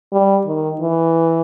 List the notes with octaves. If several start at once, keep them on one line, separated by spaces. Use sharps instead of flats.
G3
D#3
E3